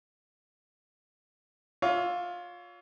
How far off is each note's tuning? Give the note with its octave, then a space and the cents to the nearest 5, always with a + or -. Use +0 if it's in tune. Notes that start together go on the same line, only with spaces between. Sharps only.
F4 +20 C#5 +35 E5 +20